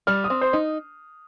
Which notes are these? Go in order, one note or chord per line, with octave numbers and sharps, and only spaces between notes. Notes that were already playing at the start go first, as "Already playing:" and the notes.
G3 F6
D#6
C4
C5
D#4